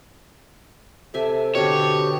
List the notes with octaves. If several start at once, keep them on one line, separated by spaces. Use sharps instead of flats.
C3 A4 E5 G#5
B2 D3 G4 C#5